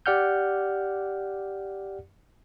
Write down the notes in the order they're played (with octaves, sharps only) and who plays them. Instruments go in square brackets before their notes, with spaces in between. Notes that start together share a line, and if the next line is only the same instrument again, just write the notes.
[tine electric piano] G4 D5 F#5 F6 G6